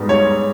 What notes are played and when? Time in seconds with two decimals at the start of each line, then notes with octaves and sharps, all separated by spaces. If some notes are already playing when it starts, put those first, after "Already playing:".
Already playing: G#2 G3 B3 D#4
0.09 C#5